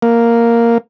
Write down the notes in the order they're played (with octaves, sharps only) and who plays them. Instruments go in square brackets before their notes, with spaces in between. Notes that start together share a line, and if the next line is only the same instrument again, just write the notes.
[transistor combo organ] A#3